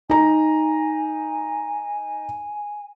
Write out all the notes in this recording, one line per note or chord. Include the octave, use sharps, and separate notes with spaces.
D#4 G#5 A#5